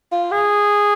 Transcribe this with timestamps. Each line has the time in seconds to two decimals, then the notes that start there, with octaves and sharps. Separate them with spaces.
0.12 F4
0.31 G#4